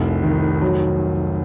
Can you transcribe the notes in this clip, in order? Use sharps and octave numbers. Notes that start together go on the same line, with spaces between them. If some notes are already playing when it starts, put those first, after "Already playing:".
Already playing: F1 C2
D#3
F#3